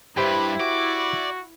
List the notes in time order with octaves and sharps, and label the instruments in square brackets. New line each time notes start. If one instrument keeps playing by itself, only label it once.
[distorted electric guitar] G2 [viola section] E4 [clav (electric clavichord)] G4 C5 G5 [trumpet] B4
[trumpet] F#4 [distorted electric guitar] D5